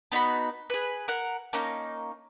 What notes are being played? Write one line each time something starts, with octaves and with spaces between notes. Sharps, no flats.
B3 D#4 F#4 B5
G#4 B4
A#4 F#5
A#3 C#4 D#4